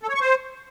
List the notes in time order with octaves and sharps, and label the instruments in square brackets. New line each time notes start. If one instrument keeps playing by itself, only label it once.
[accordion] A4
C#5
C#6
C5